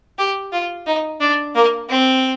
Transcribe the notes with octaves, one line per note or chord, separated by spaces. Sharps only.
G4
F4
D#4
D4
A#3
C4